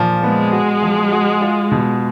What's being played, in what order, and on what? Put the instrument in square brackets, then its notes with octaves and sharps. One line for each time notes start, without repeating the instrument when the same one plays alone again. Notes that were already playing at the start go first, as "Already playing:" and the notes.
Already playing: [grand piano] A#2 F3
[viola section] G#3 [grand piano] B3
[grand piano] F#4
F3
F#4
F4
B2